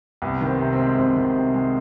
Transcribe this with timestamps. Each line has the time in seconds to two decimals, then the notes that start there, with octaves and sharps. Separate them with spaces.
0.22 C2 B3
0.41 D#3
0.47 C4
0.59 C3
0.73 C4
0.79 G#3
0.98 C2 C4
1.16 D#3
1.35 C3
1.54 G#3